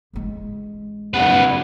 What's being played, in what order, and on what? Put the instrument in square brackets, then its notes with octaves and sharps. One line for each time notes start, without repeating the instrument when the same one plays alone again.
[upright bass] A1 G#3
[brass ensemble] F#1 G2 [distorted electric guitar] C4 B4 [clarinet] F#5